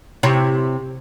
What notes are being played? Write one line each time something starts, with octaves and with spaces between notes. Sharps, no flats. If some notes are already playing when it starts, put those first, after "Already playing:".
C3 E4 C#5